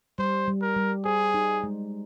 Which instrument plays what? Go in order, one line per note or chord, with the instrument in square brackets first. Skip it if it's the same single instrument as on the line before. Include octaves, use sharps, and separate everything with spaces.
[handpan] G3 [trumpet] C5
[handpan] G3
[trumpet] A#4
[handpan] G3
[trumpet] G#4 [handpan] C5
[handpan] D#4
G#3